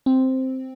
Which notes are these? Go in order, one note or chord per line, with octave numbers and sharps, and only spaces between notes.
C4